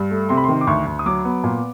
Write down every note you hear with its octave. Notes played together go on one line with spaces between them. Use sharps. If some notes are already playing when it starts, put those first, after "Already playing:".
Already playing: G2
A3
C3 C6
B5
D#3 C6
D6
D2 C#6
D2
D#6
F#3 D6
B3
A#2